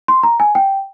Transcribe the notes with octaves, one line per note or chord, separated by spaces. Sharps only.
C6
A#5
G#5
G5